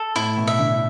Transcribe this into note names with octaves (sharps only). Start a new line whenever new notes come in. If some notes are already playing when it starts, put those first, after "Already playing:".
Already playing: A4
A2 E4
B2
E5
D3